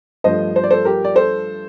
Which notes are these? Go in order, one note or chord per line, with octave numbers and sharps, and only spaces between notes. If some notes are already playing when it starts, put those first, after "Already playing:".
G2 F3 A3 C5 D#5
C5
D5
A4 C5
G4 A#4
D5
A4 C5